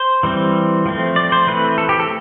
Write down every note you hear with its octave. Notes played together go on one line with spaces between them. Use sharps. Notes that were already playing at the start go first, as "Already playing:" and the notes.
Already playing: C5
E3 G3 C4
F3 A3 C4
D5
C5
E3 A3 C4 B4
A4
G4
A4